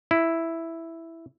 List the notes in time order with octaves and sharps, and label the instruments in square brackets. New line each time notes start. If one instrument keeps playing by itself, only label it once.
[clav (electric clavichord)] E4